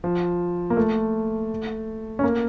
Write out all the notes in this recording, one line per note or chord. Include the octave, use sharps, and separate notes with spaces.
F3
A#3
A3
C#4
A#3